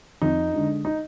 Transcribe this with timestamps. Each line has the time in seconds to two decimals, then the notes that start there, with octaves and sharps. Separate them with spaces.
0.22 F2 D#4
0.53 D3 G#3 D4
0.85 D#4